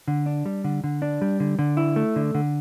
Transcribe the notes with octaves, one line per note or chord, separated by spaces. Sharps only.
D3
D4
G3
D3
D3
D4
G3
D3
D3
E4
A3
D3
D3